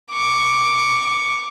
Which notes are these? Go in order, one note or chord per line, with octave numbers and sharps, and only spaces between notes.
C#6 D6